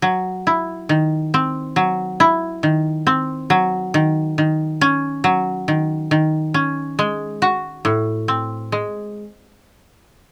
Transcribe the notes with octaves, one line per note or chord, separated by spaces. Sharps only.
F#3
E4
D#3
C4
F#3
E4
D#3
C4
F#3
D#3
D#3
C#4
F#3
D#3
D#3
C#4
G#3
F#4
A2
C4
G#3